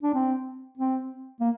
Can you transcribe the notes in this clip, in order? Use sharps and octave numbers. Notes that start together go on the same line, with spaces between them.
D4
C4
C4
A#3